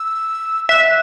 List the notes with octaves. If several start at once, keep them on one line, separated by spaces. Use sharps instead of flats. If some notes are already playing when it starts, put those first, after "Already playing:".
Already playing: E6
E5 F#6